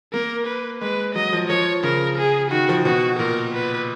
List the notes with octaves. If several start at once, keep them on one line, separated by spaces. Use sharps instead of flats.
A#3 A#4
B4
G#3 B4
F#3 D#5
F3
F3 C#5
C#3 A#4
G#4
D#3 F#4
F3
B2 F#4
A#2 A#4
B4